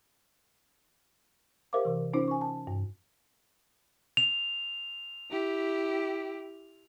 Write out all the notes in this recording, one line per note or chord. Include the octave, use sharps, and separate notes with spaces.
G4 A#4 C5 E5 F5 D6
C3 E3
C#4 D#4 F4 C5
G#5 C#6
A5
G2
F7
E4 G4